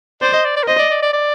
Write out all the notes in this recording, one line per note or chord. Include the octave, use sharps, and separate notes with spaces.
C5 D5
D#5
D5
D5
A#4
C5 D#5
D5
D5
D5
D5